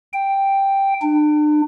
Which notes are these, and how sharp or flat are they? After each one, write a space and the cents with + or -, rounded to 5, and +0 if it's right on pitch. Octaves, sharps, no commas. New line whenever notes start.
G5 +0
D4 +40